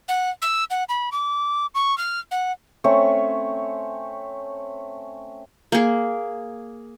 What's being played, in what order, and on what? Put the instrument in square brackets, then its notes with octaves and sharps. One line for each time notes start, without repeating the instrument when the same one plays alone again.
[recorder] F#5
E6
F#5
B5
D6
C#6
F6
F#5
[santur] A3 C4 C#4 C#5
[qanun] A#3 G#4